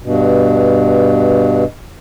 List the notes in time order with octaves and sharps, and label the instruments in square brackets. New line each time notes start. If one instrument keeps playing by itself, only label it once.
[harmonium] G2 B2